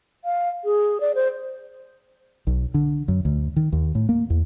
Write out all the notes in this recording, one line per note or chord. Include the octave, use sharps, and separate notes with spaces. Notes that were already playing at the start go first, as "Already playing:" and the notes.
F5
G#4
D5
C5
B1
D3
F#2
D2
D#3
D#2
A2
A#3
E2